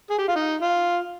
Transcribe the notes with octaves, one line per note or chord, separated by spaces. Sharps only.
G#4
G4
F4
D#4
F4